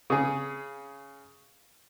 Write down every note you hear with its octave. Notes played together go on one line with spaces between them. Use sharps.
C#3 G#4